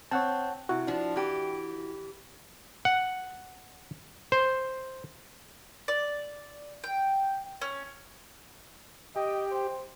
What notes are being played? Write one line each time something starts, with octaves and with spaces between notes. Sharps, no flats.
C4 C#5 F#5 A5
C3 E4 F#4
F3 D4
E3 G4
F#5
C5
D5
G5
C#4
G4 D#5 G5
C5